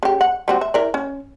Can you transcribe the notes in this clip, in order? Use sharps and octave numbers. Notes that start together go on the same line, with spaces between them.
C#3 G4
F#5
G3 C4 F#4
E5
E4 A#4 D5
C#4